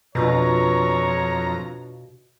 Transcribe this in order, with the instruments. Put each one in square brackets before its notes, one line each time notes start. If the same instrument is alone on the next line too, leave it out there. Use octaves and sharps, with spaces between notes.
[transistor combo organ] F2 A#5 [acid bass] B2 [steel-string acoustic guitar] D4 F4 B4 [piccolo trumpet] C#5